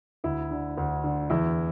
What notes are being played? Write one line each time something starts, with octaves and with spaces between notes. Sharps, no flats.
D2 E4
D3
D2
D3
E2 E4